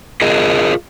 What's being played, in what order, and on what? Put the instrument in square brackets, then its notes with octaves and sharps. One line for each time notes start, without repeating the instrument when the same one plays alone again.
[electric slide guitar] F4 G#4 A#4 D#5